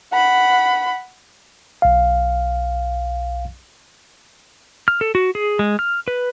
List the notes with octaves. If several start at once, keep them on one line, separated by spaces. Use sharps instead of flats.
F#5 B5
B1 F5
F6
A4
F#4
G#4
G#3
F6
B4